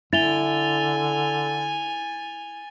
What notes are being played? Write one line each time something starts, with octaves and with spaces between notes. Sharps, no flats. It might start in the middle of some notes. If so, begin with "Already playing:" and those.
D3 E4 G#5 A6 F7 G7